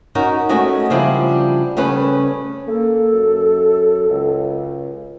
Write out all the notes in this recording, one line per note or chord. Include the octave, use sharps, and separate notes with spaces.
C#4 D#4 F#4 A#4
G#3 A3 C#4 F#4 D#5 G#5
C#3 F3 G3 D4 E4 F4
C#3 G3 A3 C#4 B4
A#3 A4
F#2
C#2